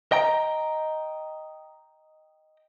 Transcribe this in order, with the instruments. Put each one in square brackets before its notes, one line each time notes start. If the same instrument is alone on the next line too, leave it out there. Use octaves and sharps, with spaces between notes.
[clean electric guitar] D#5 G5 A#5